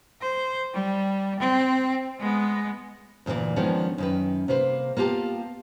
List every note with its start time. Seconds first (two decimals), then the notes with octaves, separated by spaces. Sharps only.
0.21 C5
0.74 G3
1.40 C4
2.19 G#3 B3
3.26 D2 A#2 C#3 E3 D5
3.56 D#3 F3 G#3 B3 C#4 D4
3.98 F#2 D#3 B4
4.48 C3 A#3 B4 C5
4.97 A#3 B3 F4 G4 A5